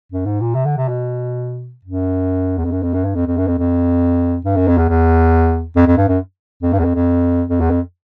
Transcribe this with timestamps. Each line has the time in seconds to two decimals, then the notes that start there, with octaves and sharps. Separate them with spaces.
0.12 F#2
0.26 G#2
0.40 A#2
0.54 C3
0.65 D3
0.77 C3
0.88 B2
1.85 F#2
2.58 E2
2.65 F2
2.71 F#2
2.82 F2
2.94 F#2
3.04 G2
3.15 F2
3.26 F2
3.37 F#2
3.47 F2
3.59 F2
4.45 G2
4.56 F#2
4.67 F2
4.78 E2
4.89 E2
5.76 F2
5.87 F2
5.97 G2
6.08 F#2
6.62 F2
6.73 G2
6.79 E2
6.84 F2
6.94 F2
7.49 F2
7.60 E2
7.70 F2